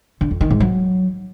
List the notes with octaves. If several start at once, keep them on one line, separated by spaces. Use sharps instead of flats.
D3
F2
D#3
G#2
F#3